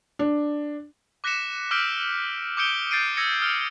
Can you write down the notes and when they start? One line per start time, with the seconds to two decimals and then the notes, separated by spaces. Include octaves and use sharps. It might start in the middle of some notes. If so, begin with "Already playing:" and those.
0.19 D4
1.24 D6 F#6 A#6 B6 C#7 E7
1.71 D6 E6 F6 G6 B6 D7
2.57 D6 D#6 G6 C#7 D7 G7
2.91 G6 A6 C7 D7 D#7
3.17 E6 G#6 A#6 C#7
3.40 D#6 F6 D7